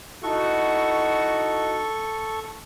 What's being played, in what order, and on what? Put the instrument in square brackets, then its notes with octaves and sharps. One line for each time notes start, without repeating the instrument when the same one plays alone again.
[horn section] D#4 E4 F#4 [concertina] A4 C#6